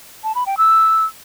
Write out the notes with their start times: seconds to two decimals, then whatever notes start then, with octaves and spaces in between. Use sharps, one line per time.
0.24 A5
0.35 B5
0.46 G5
0.58 E6